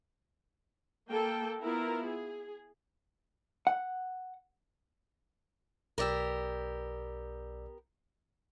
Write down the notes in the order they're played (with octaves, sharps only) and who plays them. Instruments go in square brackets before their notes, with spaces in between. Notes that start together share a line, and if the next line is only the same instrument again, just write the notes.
[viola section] A#3 A4 G5
B3 E4 F4 A#4
G#4
[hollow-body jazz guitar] F#5
[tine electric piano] B1 D5 E6 [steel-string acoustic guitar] B3 G4 A#4